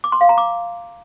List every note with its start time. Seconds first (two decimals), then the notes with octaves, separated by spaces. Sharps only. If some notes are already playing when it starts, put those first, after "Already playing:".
0.04 D6
0.12 C6
0.21 F5
0.29 A#5
0.38 D6